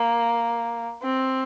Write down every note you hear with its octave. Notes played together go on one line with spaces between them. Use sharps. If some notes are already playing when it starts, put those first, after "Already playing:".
Already playing: A#3
C4